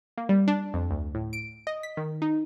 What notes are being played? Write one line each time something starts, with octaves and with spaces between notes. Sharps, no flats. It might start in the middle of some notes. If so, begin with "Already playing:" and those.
A#3
G3
D4
F2
D2
A2
D7
D#5
B6
D#3
D#4